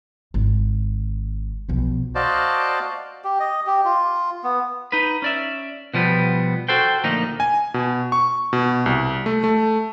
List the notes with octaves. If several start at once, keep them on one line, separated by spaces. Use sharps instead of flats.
G#1
B1 F3
F#4 C5 D5 D#5 F5 A5
G4
D#5
G4
F4
B3
D#4 B4
C#4 D5 E5
B2 F3 G3 B3
F#4 A4 C5 G5
D2 A#2 F3 D#4
G#5
B2
C#6
B2
C2
A3
A3